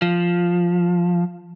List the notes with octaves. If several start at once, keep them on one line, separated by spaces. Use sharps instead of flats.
F3